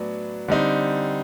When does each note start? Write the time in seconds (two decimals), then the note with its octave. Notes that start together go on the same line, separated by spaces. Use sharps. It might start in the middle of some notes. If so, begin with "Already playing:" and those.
Already playing: A2 F#3 B3 D4
0.48 D3 G3 C4 D#4